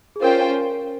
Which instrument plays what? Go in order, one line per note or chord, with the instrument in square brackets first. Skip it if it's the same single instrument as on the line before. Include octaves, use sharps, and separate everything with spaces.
[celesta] G#4
[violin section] C#4 F4 C5 G5 [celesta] A#4